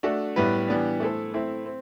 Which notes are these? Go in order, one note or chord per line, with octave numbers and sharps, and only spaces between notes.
A3 D4 F#4 A4
A2 G3 B3 E4 B4
E3 G3 B3 D4
A3 E4 A4 C5
A3 C4 E4
C4